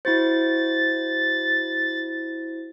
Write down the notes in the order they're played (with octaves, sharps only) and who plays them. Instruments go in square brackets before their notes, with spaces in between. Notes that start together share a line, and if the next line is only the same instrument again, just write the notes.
[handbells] E4 F#4 C5 [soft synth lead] A6